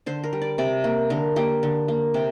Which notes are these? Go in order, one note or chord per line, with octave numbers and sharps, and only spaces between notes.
D3 C5
A#4
G3
D5
C3 D5
A#3
D3 A#4
A#3 G4
D3
A#3
C3 G4